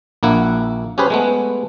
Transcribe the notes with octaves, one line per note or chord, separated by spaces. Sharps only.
A#1 A#3 E4 F#5
C#4 G4 G#4 B4 C5
G#3 A3 B3